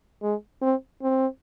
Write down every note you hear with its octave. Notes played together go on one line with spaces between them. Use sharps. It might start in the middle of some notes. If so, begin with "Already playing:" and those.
G#3
C4
C4